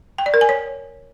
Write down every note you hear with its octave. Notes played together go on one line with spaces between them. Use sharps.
G5
D5
A#4
G#5
C#5